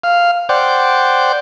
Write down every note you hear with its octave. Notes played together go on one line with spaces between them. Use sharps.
F5
C5 D5 F#5 G5